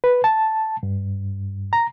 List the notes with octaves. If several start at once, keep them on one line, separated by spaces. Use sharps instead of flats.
B4
A5
G2
A#5